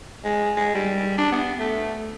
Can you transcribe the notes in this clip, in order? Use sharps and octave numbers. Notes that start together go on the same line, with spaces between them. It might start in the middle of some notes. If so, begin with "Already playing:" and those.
G#3
G#3
G3
D4
B3
A3